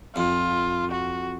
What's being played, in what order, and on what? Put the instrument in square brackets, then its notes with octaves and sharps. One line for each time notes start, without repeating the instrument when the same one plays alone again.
[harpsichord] F2 [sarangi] F4
[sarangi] F#4